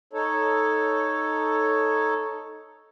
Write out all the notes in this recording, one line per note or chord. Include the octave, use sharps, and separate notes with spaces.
D#4 A4 C#5